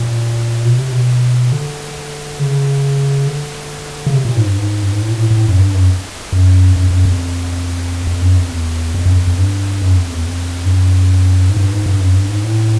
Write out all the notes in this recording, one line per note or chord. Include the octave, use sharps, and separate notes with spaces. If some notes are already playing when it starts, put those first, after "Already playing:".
Already playing: A#2
B2
C3
B2
D3
C#3
D3
C#3
C3
A#2
G#2
G2
G#2
G2
G#2
A2
A#2
A2
A2
F#2
G2
F#2
F#2
F#2
F#2
F2
F2
F#2
F2
E2
F2
F#2
F2
F2
G2
F#2
F2
E2
F2
G2
F#2
G#2
G2
G#2
G2
F#2
G2
G#2
A2